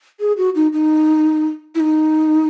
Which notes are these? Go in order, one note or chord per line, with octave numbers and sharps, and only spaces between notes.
G#4
F#4
D#4
D#4
E4
D#4